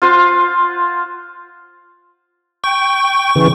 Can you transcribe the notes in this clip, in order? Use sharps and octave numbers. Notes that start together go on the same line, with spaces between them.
F4 C5 F5 F#5
G5 C#6
C#3 E3